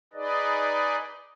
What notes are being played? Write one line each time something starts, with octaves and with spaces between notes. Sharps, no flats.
D#4 G#4 B4 D5 D#5